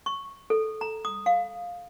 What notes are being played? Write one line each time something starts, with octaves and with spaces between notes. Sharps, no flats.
C#6
A4
A#5
D#6
F5